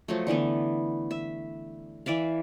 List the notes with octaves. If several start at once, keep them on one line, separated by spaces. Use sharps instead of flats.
F3 F#3 A3
D3 E3 A3 B3
E5
E3 D5 E5 F5